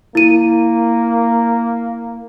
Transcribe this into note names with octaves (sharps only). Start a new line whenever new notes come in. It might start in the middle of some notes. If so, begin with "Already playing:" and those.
A#3 E4 D#7